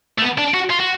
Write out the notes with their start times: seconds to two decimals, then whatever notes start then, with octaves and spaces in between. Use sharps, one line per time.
0.18 A3
0.22 B3
0.38 D4
0.54 F#4
0.70 F4
0.80 F#4